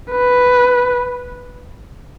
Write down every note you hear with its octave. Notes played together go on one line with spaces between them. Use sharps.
B4